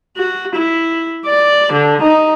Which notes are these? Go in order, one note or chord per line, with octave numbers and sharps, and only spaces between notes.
F#4
E4
D5
D3
D#4